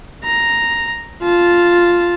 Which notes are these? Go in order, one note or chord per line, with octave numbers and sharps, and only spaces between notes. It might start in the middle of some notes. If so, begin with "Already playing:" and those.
A#5
F4 A5